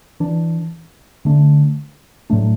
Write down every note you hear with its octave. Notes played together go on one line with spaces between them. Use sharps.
E3 D4
D3 A3 D4
A2 F#3 A3 D4